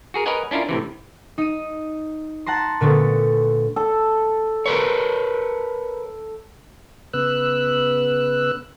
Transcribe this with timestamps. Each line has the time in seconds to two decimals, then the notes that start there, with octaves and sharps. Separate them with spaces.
0.14 F#4 G#4 A#4
0.26 A#4 B4 C#5 D#5 F#5 G#5
0.51 C#4 D4 E4 F4 A#4
0.69 A2 C3 E3
1.38 D#4 D#7
2.46 F#5 A5 A#5 C6
2.81 A#2 D3 A3 B3
3.76 A4
4.66 A#4 B4 C#5
7.13 C#3 B3 B4 E6 F#6